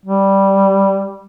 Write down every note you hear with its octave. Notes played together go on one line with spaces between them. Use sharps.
G3